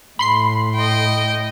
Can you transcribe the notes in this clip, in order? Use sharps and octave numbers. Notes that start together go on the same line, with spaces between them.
A2 B5 C6 C7
D#5 G5